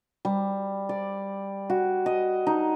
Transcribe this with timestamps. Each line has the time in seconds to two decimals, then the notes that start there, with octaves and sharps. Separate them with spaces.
0.25 G3
0.89 D5
1.70 F#4
2.06 D#5
2.47 D#4